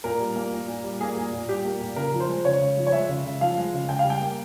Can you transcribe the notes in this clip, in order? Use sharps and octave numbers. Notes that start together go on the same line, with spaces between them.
A#2 A#4
G3
A#3
A#2
A#2
G3
A#3 G#4
A#2
A#2
G3 G4
A#3
A#2
C#3 A#4
F3
C5
G#3
C#3 C#5
C#3
F3
C#5
G#3 E5
C#3
C#3
F3 F5
G#3
C#3
C#3 G5
F5
G3
G5
A#3